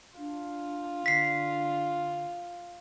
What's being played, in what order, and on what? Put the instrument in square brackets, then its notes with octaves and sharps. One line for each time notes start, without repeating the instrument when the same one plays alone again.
[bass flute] D4 [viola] F4
[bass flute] D3 [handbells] B6 C7